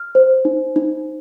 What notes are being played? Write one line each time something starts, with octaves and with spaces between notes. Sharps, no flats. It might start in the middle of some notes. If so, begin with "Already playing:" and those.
Already playing: F6
C5
D#4
D#4